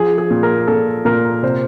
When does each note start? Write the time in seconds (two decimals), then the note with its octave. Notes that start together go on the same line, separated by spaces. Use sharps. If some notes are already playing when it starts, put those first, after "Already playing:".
Already playing: F3 G#4
0.18 G#4
0.31 A#2
0.43 A#4
0.68 A#2 A4
1.05 A#2 A#4
1.43 C3 C5